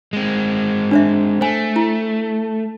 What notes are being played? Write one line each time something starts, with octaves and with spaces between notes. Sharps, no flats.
G#3 C4
D4 C5 E5
A3 C5 G#5
E4